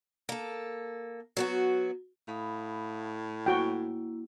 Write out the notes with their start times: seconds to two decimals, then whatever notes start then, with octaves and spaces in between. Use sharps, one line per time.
0.29 A#3 A4
1.37 F#3 B3 F#4
2.28 A2 F5 B5 D#6
3.46 A#3 E4 F#4 G5